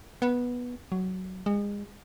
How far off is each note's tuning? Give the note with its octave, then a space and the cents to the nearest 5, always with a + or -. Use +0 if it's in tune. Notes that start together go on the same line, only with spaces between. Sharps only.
B3 -10
F#3 +10
G#3 -30